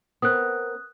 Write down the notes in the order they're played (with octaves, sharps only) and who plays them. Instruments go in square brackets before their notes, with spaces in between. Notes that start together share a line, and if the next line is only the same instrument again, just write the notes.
[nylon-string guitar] B3 C4 A#4 [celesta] D#6 F#6